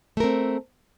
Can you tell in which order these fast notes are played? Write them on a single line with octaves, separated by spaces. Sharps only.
A3 A#4 C4